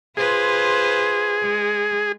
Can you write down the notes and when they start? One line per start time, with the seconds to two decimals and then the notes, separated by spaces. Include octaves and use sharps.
0.17 F4 G#4 B4 C5
1.42 G#3